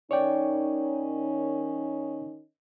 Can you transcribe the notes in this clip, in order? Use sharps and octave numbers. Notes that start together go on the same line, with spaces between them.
D#3 C#4 D#4 C#5 D5 G5